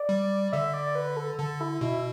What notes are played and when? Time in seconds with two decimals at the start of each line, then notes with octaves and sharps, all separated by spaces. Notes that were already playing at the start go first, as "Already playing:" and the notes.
Already playing: D5
0.09 G3
0.53 D3 E5
0.73 D5
0.95 B4
1.17 A4
1.39 D3 A4
1.61 E4
1.81 B2 E4